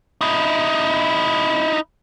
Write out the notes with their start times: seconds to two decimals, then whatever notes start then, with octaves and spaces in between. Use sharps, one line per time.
0.21 D#4 E4